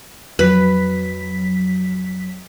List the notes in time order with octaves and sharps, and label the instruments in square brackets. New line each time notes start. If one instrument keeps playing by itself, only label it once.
[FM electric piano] F2 F#3 B6 [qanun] B4